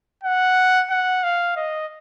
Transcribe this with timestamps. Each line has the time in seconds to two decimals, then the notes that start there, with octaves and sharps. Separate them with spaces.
0.24 F#5
0.90 F#5
1.24 F5
1.57 D#5